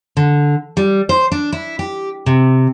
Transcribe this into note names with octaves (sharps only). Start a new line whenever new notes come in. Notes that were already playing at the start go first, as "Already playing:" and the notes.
D3
G3
C5
D4
E4
G4
C3